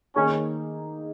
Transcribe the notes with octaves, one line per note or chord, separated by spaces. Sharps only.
D#3 A#3 C#4 D#4 G#4